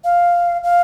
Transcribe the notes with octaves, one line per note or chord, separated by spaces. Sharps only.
F5
F5